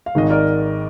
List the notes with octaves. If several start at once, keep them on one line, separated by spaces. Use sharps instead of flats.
F5
G#1 G#2 D#3 G#3 D#5
A#4 D5